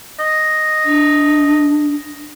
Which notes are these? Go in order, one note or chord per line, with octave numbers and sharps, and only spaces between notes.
D#5
D4